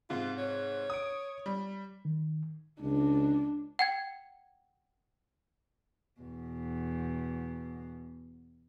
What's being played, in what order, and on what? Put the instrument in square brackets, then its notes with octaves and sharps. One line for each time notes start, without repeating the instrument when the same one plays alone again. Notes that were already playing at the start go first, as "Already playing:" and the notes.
[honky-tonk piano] G#2 C3 [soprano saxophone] F4
[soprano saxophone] C#5
[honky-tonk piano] D#6 D7
G3
[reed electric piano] D#3
[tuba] C#2 [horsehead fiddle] D4
[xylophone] F#5 G5 G#6
[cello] E2 B2